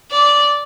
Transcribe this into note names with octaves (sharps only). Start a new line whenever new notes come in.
D5